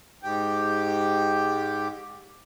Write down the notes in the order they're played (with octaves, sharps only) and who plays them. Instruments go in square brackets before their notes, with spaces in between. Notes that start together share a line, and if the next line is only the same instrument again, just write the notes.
[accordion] G#2 G4